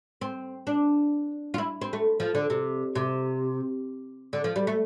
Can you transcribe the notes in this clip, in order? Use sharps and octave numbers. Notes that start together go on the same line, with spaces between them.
C4
D4
F4
E4
C4
A3
F3
D3
C3
C3
D3
F3
G3
A3